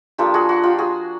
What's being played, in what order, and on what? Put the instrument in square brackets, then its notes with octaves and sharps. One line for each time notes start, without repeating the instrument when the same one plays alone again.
[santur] F3 A#3 D4 F4 G4 A4
F#4 G#4
F#4
F4 G4
F#4 G#4